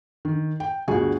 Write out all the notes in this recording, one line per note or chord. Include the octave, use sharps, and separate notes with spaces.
D#3
G5
G1 D2 G3 F4 F#4 G#4